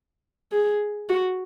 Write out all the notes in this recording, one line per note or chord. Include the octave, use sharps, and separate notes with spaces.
G#4
F#4